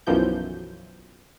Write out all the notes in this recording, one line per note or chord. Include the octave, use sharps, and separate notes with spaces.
B1 F#2 E3 F3 G6